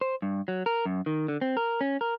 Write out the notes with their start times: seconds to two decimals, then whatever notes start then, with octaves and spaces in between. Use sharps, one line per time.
0.01 C5
0.22 G2
0.48 F#3
0.66 A#4
0.85 F#2
1.06 D#3
1.28 D3
1.41 C4
1.57 A#4
1.81 C#4
2.01 A#4